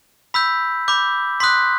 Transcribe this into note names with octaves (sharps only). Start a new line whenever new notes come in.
B5 E6 G6 B6
B5 D6 G6
C6 D#6 F#6 B6